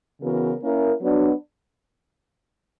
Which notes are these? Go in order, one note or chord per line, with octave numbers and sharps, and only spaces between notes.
C#3 E3 B3 F#4 A#4
A#3 C#4 E4 A#4
F#3 B3 D4 F#4